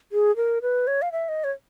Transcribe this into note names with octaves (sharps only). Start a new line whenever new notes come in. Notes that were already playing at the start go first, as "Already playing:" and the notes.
G#4
A#4
B4
C#5
F5
E5
D#5
C#5